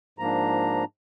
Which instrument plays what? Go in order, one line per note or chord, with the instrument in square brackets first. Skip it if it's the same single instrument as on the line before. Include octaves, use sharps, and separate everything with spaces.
[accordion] G#2 F3 A#3 D4 A#5